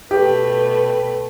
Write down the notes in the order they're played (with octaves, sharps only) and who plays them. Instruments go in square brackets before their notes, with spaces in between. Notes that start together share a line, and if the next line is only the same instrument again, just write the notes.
[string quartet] B2 A3 B4 [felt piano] G4